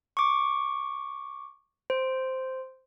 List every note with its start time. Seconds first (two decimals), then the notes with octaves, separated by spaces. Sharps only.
0.17 C#6 D6
1.90 C5